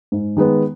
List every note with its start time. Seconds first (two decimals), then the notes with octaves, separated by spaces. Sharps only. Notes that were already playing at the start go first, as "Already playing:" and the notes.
0.12 G#2
0.37 D#3 G#3 B3